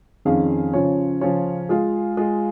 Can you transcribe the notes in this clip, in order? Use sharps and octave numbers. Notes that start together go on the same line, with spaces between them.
F2 D#3 C#4 G#4 F5
C#3 F3 C#4 F4 C#5
C#3 F3 C#4 F4 C#5
G#3 F4 G#4 F5
G#3 F4 G#4 F5